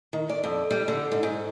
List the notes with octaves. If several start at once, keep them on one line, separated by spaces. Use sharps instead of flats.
D#3
D5
F2
G3
D3
G#2
G#2